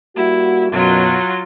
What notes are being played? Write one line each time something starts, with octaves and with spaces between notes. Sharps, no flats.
G3 A#3 E4 F#4
F#2 B2 F#3 F4